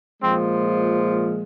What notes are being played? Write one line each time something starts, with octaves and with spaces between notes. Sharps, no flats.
A#2 F3 G#3 C4